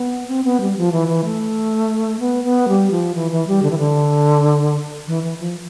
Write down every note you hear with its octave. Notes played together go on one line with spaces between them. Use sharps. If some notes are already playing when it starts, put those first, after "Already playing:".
Already playing: B3
C4
B3
G3
F3
E3
E3
A3
B3
B3
G3
F3
E3
E3
G3
D3
E3
D3
E3
E3
F3